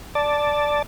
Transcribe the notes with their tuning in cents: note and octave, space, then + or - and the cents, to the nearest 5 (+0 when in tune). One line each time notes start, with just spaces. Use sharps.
D5 +0 A5 +0